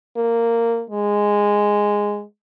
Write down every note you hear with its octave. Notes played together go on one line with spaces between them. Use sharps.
A#3
G#3